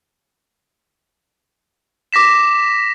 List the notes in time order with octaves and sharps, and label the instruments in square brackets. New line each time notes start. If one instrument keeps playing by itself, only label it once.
[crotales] D6 A#6 B6 E7